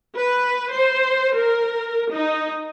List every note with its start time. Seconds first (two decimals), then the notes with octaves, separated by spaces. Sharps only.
0.17 B4
0.71 C5
1.36 A#4
2.11 D#4